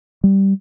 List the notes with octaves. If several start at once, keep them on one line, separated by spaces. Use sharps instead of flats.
G3